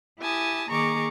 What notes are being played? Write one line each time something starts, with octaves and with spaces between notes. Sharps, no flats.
E4 G4 G#5 A5 D#6
D#3 A#3 G#4 A#5 C#6 D6